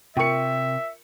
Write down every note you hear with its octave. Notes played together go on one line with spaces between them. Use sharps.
C3 F4 A#4 E5 G5 C#6 C#7